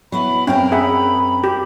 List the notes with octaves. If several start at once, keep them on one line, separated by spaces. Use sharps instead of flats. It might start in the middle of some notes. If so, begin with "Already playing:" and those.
F#3 B3 E4 B5
F#2 C4 C#4 A#4 G5
G#4 E5 F#5 B5
G4